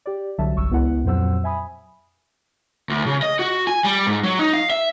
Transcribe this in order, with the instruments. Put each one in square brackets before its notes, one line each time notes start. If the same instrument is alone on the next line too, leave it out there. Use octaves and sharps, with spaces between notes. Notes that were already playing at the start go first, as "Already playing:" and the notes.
[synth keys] G4 D5
C2 D3 F#3 E5 A5
G1 C2 C#6 E6
C#2 B3 E4 F#5
F2 A#2 F#3 C5 F#5 E6
E5 G#5 B5 D#6
[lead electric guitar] D2
C#3
D#5
F#4
G#5
G3
G#2
F#3
D#4
F5
E5